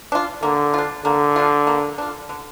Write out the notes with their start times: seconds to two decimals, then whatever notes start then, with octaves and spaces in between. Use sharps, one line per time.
0.12 D4 F4
0.42 D3 A#3
0.74 D4 F4
1.05 D3 A#3
1.36 D4 F4
1.67 A#3
1.98 D4 F4
2.29 D3